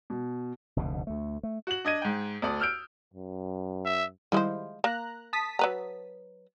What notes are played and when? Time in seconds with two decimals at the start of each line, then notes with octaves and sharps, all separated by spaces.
0.10 B2
0.76 F1 D2 G#2 B2
1.07 D2 A3
1.43 A3
1.67 F#4 F#7
1.85 D4 D#5 G#6 D#7
2.02 G#2 G5
2.42 D2 A4 D5 D#6
2.60 E6 F6 G6 D7
3.14 F#2
3.85 E5
4.32 D#3 F3 G3 G#3 E4 C5
4.84 A#3 A#5 F#6
5.33 A5 D#6 B6
5.59 F#3 B4 A#5